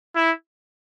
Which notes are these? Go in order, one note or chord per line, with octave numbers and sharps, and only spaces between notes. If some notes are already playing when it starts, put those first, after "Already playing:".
E4